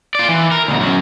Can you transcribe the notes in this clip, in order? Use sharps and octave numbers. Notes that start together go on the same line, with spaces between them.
F4 D5
E3
A#4
D2 B2
F#2 F#3